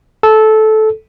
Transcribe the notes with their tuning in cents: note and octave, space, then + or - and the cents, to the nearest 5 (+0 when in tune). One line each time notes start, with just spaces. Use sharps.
A4 -15